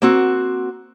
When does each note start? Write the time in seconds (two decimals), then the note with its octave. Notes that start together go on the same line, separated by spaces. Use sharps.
0.02 A#3 C4 F#4